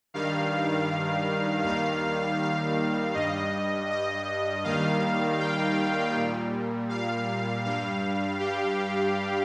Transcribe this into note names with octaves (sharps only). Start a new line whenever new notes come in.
G2 D#3 G3 F5
D#2 D#3 G3 F5
F5
G2 G3 D#5
D#5
D#2 D#3 G3 F5
G5
A#2 G3
F5
G2 G3 F5
G4